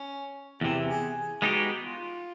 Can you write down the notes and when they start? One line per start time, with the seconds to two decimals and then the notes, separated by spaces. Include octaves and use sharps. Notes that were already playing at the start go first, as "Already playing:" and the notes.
Already playing: C#4
0.61 E2 C3 E3 G4
0.89 G#4
1.16 G#4
1.42 G#3 B3 D#4 F#4 G4
1.83 F4